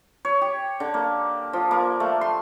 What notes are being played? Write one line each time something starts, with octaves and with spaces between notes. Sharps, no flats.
C#5
G4
D3
A#3
F3
A#3
A3
C6